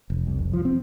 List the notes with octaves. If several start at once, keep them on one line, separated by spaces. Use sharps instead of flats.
F1
C2
F1
F3
C4